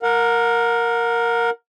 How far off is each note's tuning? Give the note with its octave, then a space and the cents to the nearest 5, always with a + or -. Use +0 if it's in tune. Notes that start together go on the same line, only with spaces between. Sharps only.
A#4 +0 F#5 -35